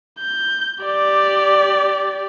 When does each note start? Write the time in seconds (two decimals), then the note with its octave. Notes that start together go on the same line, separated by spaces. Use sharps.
0.19 G6
0.84 G4 D5